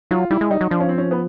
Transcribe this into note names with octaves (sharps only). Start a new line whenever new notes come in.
F#3 F4
G3 E4
G#3
G3 D#4
F#3
F3 D4
C#4
C4
C#4
B3